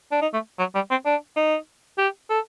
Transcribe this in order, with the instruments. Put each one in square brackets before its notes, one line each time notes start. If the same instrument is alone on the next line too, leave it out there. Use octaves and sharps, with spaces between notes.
[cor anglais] D4
D#4
A3
F#3
G3
C4
D4
D#4
G4
A4